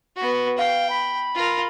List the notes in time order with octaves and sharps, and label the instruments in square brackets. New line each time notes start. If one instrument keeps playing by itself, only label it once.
[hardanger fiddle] B3 F#4
[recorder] F5 [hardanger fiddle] G5
[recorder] B5
[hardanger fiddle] F4 A#4